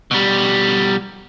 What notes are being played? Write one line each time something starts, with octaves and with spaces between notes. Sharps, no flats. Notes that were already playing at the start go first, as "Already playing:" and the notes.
B2 G3